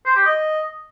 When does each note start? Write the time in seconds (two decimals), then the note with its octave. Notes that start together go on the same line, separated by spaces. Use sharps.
0.06 C5
0.16 G4
0.26 D#5